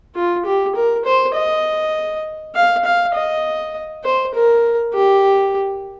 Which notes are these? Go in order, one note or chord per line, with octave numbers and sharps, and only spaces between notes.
F4
G4
A#4
C5
D#5
F5
F5
D#5
C5
A#4
G4